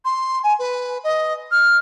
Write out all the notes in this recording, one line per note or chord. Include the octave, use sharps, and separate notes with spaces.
C6
G#5
B4
D#5
F6